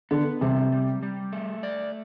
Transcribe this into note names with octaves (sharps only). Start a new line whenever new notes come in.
D3 B3
C3 G3
G3
G3
A3
D5